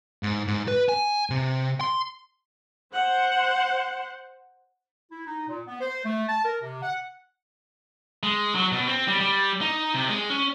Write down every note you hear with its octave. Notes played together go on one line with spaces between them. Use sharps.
G#2
G#2
B4
G#5
C3
C6
C5 F#5
E4
D#4
A#2
B3
C5
A3
A5
A#4
C3
F#5
G#3
F#3
B2
C4
G3
G3
D#4
C3
G#3
C#4